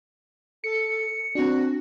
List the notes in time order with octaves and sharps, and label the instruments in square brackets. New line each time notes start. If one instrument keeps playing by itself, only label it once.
[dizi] A4 [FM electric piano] C#7
[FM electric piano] C4 D4 [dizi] F#4